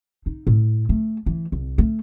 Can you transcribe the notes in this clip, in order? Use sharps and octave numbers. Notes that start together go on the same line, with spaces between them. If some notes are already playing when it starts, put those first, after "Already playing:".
D#4
A2
A3
E3
C2
A3